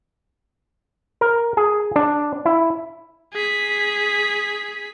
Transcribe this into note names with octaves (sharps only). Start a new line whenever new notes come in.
A#4
G#4
D4
E4
G#4 B6